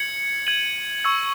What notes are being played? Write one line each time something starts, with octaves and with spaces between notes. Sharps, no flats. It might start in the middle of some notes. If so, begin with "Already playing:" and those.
Already playing: G#6 C#7 F#7
G#6 D#7 F#7
C#6 E6 G#6